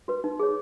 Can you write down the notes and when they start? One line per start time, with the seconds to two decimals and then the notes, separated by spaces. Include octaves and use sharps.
0.08 F#4 B4
0.24 D#4
0.40 G#4 C#5